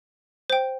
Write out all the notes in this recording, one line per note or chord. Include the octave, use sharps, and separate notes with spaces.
C5 G5